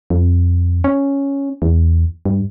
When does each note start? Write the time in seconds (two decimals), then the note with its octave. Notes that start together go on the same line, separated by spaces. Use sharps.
0.10 F2
0.84 C#4
1.62 E2
2.25 G2